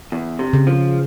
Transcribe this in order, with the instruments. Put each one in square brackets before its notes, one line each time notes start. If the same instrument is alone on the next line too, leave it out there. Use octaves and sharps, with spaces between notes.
[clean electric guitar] E2
C3
[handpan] C#3
[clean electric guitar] F3